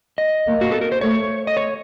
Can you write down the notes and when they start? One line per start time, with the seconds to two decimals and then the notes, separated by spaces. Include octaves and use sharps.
0.18 D#5
0.47 A#3
0.61 F#4
0.71 A4
0.81 A#4
0.92 C5
1.01 A3 C#5
1.47 D#5
1.57 C#5